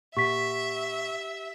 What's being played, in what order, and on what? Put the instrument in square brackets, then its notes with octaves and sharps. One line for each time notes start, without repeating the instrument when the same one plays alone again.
[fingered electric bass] A#2 [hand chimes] G4 F#5 [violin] E5 [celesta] C#6 B6